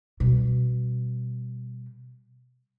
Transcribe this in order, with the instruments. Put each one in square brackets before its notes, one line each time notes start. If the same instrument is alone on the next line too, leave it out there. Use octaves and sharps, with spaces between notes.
[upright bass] B2 G3